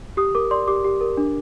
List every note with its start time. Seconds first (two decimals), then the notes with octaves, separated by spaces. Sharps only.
0.17 G4 D#6
0.35 A#4 D6
0.51 D5 C6
0.67 G4 D6
0.84 G4
1.01 A#4
1.17 D4